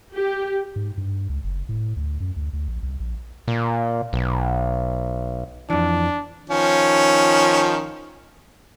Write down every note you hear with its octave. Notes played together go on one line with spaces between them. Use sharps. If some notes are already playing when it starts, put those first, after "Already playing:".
G4
G#2
G2
C#2
F#1
A2
D2
F#2
D2
D2
A#1
C2
A#1
A#2
B1
F2 E3 D4
D#3 F3 C#4